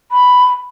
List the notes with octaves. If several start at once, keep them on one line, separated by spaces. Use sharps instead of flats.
B5